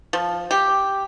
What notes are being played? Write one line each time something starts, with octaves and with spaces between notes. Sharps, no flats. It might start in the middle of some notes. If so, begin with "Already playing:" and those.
F3
G4